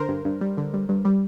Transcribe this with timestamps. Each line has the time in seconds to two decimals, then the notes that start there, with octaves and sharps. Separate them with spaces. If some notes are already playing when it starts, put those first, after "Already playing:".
Already playing: D3 A#4 C5
0.09 G2
0.25 G2
0.41 G3
0.57 D3
0.73 G2
0.89 G2
1.05 G3